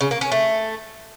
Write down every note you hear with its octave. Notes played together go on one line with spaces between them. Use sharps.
C#3
A#3
C#4
A3